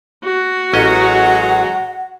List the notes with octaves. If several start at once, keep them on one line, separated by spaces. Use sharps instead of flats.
F#4
A1 F#3 G#3 C#4 D#5 F#5 A#5